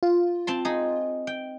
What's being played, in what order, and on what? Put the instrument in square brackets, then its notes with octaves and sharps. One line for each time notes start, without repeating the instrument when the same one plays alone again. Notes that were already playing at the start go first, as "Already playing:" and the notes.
[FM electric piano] F4
[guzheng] C4 A5 C6
D#4 G#4
G5